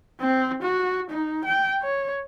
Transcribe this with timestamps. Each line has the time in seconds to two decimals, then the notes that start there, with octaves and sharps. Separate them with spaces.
0.20 C4
0.63 F#4
1.10 D#4
1.45 G5
1.82 C#5